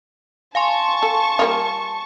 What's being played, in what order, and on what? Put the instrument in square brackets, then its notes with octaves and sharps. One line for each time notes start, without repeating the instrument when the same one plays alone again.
[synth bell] F5 G#5 C6 [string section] A5 C#6
[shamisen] A4
G3 A#3 F4